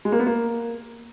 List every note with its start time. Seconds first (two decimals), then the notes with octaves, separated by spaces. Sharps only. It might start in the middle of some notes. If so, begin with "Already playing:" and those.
0.05 G#3
0.12 A#3
0.19 B3
0.27 A#3